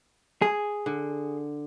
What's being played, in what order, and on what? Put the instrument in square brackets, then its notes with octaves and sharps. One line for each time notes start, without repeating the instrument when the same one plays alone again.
[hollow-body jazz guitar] G#4
[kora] D3